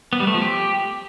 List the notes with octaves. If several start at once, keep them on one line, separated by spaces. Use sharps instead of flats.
B3
G3
A3
F3
G4